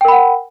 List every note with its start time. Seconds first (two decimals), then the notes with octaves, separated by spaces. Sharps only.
0.01 G5
0.05 A#4
0.08 B5
0.12 F#5